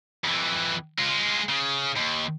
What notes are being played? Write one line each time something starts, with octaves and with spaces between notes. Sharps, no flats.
F2 E3
G#3 F4
C#3
D#2